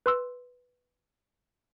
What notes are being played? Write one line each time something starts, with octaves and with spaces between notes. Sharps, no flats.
B4 C6 E6